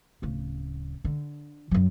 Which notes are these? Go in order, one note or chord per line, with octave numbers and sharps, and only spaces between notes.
D1 C#3
D3
F#2 F#3